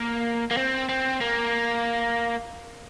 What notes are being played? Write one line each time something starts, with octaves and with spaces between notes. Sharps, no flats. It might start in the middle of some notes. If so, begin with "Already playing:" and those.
Already playing: A#3
A#3
C4
C4
A#3